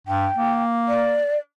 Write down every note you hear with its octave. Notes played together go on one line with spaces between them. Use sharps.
G2 G5
A#3
D5